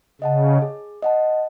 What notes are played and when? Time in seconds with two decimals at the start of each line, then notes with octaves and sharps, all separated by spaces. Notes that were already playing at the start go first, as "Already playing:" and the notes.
0.21 C#3 D#5 F#5 A5
0.62 G#4
1.02 D#5 F#5 A5